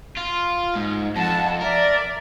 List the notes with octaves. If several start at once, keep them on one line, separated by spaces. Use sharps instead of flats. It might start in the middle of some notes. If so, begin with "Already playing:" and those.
F4
G#2
F2 F#5 A5
A#4 D5 E5